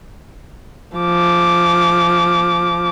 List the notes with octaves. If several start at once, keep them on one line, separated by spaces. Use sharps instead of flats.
F3 D6